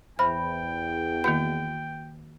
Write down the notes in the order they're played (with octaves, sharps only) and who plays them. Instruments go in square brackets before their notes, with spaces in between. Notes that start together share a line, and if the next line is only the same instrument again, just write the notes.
[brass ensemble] E2 [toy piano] C5 E5 B5 [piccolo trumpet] G5 [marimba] F6
[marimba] D#3 A#3 G6 [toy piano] F#4 B4 F#5